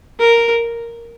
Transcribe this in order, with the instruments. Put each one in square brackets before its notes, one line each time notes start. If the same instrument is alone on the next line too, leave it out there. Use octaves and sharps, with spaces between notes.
[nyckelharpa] A#4